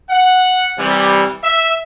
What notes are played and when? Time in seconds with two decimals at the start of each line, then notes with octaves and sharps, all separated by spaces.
0.10 F#5
0.77 C3 E3 G3
1.43 E5